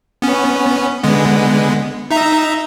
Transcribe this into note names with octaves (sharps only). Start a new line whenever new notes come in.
B3 C#4
D3 G#3 B3
D#4 E5 A#5